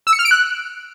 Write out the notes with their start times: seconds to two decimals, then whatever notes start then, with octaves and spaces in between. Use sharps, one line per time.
0.07 E6
0.13 C#7
0.19 F6
0.25 D7
0.31 F#6